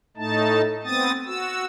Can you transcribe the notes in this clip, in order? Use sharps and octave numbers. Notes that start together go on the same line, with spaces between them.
A2 A3 D#4 A5
B3 C4 D#6 A6
F#4 E6